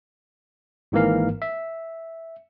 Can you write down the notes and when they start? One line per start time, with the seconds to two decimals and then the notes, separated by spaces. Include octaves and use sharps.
0.92 G#1 G#2 E3 A#3 A#4 F5
1.42 E5